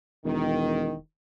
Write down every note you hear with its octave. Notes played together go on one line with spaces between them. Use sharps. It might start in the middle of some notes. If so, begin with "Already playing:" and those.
E1 D#3